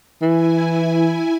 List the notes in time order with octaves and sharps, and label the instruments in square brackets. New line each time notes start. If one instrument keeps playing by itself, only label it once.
[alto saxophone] E3 [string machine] E4 G#5